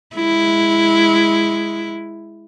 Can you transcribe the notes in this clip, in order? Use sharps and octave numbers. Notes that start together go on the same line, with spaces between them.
G#3 E4